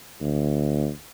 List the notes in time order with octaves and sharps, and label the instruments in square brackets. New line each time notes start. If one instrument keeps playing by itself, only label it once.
[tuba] D2